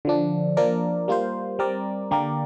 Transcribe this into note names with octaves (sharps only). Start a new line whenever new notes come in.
D3 F3 D4
F3 A#3 D4 A#4 D5
G3 A#3 F4 C5
G3 C4 A#4 D5
D3 A#3 G4 A#4 D5